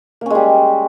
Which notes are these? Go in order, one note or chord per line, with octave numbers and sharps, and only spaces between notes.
G3 G#3 A#3 C#4